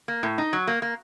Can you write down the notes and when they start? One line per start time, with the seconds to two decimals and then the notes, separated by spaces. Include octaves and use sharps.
0.08 A#3
0.23 A2
0.38 D#4
0.53 F#3
0.67 A#3
0.82 A#3